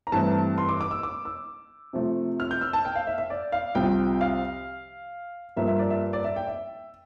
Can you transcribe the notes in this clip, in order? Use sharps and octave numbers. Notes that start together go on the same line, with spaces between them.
A#5
G2 E3 A3 C4 A5
C6
D6
D6
E6
D6
E6
C3 F3 A3
F6
G6
E6
A5
G5
F5
E5
E5
D5
F5
C2 C3 F3 G5
F5
G2 F3 A#3 E5
E5
D5
E5
D5
E5
G5
E5